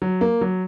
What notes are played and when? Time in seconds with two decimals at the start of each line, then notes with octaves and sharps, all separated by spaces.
0.02 F#3
0.21 A#3
0.41 F#3